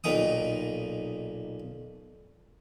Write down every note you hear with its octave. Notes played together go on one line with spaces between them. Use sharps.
B1 A#2 D#4 G5 D#6